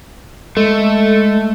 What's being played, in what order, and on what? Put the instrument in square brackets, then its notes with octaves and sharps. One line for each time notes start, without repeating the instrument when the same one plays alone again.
[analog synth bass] G#3 [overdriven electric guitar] A3 [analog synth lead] A4